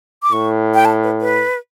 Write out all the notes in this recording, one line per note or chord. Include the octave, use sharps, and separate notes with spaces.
D6
A2 C#6
G5
A5
B4
B4